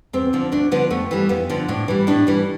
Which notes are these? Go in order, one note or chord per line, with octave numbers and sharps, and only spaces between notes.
E2 C4
D3 F3
D2 D4
D3 F3 B3
F2 A3
E3 G3
F2 B3
D3 F3
A2 D4
E3 G3
A2 D4
E3 G3